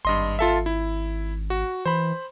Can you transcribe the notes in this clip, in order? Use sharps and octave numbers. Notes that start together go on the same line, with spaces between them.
G#1 G2 D#5 C6
F4 A4 E5
E4
F#4
E3 C5 B5